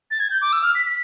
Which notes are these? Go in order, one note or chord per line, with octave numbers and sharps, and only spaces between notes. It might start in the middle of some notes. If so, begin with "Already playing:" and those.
A6
G#6
G6
D6
E6
F6
B6
B6